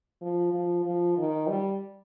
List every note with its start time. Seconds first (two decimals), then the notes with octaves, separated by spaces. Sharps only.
0.22 F3
0.53 F3
0.85 F3
1.18 D#3
1.49 G3